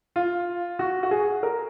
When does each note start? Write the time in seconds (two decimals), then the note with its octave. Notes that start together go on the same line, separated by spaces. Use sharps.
0.16 F4
0.79 F#4
1.03 F#4
1.11 G#4
1.43 A#4